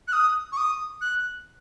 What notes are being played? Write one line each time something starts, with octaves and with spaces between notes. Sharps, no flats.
F#6
D#6
C#6
D#6
F#6